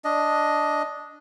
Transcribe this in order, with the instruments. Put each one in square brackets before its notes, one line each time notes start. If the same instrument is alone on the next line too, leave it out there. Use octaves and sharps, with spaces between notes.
[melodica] D4 D#5